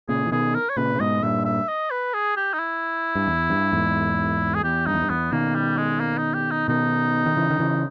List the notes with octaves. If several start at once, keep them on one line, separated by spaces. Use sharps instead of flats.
A#2 C#3 G#4
E3
B2 D#3 G#4
A#4
C#5
A#2 C#3 B4
C#3
G#2 B2 D#5
G2 A#2 E5
E5
D#5
B4
G#4
G4
D#4
E4
G2
E2
G2
E2 G#2
G#4
E2 G4
G2 D#4
E2
G2
E2 B3
B2 D#3 A#3
G3
G#3
A#3
D#4
G4
D#4
B2 D#3 D#4
D#3
C#3 E3
D#3
C#3 E3